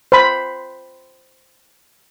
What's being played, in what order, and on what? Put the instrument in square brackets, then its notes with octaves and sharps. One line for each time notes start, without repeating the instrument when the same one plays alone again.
[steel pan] C5 B5